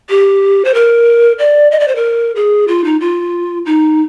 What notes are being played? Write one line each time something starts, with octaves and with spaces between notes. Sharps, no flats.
G4
C5
A#4
D5
D#5
D5
C5
A#4
G#4
F4
D#4
F4
D#4